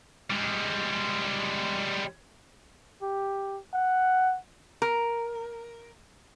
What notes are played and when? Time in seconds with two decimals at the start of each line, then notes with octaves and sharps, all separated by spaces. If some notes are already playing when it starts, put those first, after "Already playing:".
0.30 G3 G#3
3.02 G4
3.73 F#5
4.82 A#4